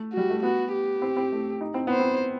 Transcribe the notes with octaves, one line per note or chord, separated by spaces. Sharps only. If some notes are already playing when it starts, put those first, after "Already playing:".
Already playing: A3
G3 F#4
A3
B3 F#4
G4
C4
C4
A3
D#4
C4
B3 C5
C4